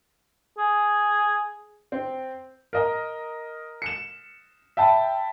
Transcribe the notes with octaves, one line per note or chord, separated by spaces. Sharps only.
G#4
C4
A#4 D#5 A#5
C#7 E7
E5 G5 A5 B5